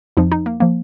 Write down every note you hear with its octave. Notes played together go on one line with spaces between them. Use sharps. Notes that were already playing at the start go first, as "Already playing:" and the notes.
F2 F3 D#4
D#4
A#3
F3 A#3